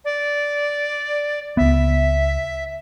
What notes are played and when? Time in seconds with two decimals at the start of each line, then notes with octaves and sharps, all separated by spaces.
0.05 D5
1.57 C#2 B3 E5